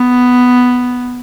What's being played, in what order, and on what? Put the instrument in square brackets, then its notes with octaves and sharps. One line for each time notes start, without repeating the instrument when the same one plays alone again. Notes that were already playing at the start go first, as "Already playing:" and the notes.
Already playing: [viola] B3